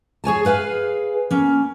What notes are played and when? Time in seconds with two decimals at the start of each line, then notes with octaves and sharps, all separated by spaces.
0.24 G#4 C#5 G#5 A5
0.45 G#4 B4 F5 G#5
1.30 A#3 C#4